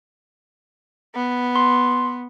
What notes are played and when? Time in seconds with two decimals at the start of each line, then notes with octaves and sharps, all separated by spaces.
1.15 B3
1.56 C6